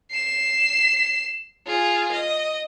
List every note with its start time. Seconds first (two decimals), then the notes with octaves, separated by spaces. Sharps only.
0.11 C7 E7
1.67 F4 G#4
2.12 D#5